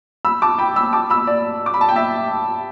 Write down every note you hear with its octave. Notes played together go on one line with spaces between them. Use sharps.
B5 E6
A5 D6
G5 B5
B5 E6
A5 D6
B5 E6
D5
D6
B5
A5
G5
E5